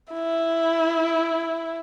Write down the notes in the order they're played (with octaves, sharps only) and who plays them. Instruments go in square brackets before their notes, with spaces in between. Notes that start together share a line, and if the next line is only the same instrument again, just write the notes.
[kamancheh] E4